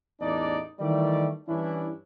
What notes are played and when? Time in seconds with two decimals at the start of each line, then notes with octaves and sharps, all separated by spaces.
0.21 A1 E2 D4 D#4 D5
0.80 D#3 E3 G3 A3 D5
1.48 G2 E3 C#4 D4 E4